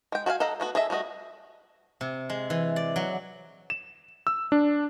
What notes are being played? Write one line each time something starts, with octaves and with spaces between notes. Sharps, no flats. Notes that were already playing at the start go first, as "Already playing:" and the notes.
G#3 G5
F#4 A4 C#5 F5 G#5
A4 D#5 F5 F#5 A#5
A3 B3 F#4
G#4 A4 D#5 E5
G3 A3 F#4 D#5
C3
G#3
E3
D5
F#3
E7
E6
D4